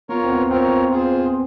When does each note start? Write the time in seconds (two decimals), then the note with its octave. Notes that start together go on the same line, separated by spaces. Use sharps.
0.09 B3 F4 A#4 C#5
0.24 C4
0.30 B3
0.51 C4 F4 A#4 C#5
0.92 F4 G#4 C5